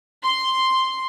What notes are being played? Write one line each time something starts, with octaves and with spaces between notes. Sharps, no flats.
C6